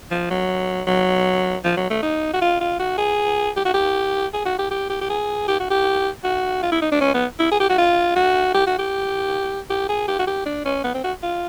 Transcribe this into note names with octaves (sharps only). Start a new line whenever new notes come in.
F3
F#3
F#3
F3
F#3
A3
D#4
F#4
F4
F4
F#4
G#4
G4
F#4
G4
G#4
F#4
G4
G4
G4
G4
G#4
G4
F#4
G4
F#4
F4
E4
D#4
D4
C#4
B3
E4
G#4
G4
F#4
F4
F#4
G4
F#4
G4
G4
G#4
G4
F#4
G4
D4
C#4
B3
C4
F#4
F4